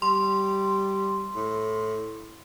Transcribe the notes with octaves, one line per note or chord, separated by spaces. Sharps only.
G3 C6
A2